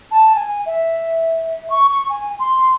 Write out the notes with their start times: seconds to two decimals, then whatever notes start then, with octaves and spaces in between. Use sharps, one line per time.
0.11 A5
0.35 G#5
0.66 E5
1.70 C#6
1.90 C#6
2.09 G#5
2.39 C6